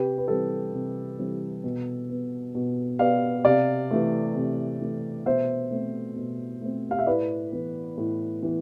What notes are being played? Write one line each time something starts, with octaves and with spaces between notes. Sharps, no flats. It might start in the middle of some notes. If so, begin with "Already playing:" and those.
Already playing: C3 G4 B4
B4
E3 G3 C4 A4
C3
E3 G3 C4
B2
B3
B2
B3 D5 F5
C3 D5 F5
E3 A3
C3
E3 A3
B2 C5 E5
A3 C4
B2
A3 C4
F5
E5
A2 B4 D5
E3 B3
A2
E3 B3